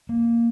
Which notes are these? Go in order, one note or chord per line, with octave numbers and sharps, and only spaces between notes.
A#3